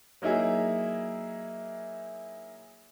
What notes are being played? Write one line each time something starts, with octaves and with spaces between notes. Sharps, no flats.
F#3 A#3 D#4 E4 G#4